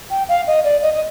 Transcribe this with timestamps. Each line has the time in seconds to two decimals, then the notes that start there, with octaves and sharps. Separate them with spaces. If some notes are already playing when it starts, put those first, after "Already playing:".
0.11 G5
0.29 F5
0.47 D#5
0.64 D5
0.82 D#5
0.94 D#5